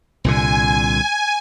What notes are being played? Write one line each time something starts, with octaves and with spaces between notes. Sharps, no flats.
C2 A#2 D3 G#5